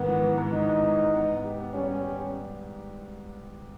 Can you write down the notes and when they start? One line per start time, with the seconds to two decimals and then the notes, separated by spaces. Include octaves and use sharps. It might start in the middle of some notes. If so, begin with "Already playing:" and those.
Already playing: G#2 D#3 B3
0.08 E3
0.23 E3
0.38 G#2
0.53 E3 D#4
0.69 G#2
0.83 E3
0.98 G#2
1.14 B3
1.29 G#2
1.44 G4
1.59 B3
1.74 G3 C#4
1.89 G3
2.04 G4
2.19 G3